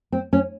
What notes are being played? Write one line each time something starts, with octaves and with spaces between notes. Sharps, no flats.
C4
C#4